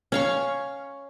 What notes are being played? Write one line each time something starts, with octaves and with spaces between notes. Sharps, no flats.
C#4 F5 C#6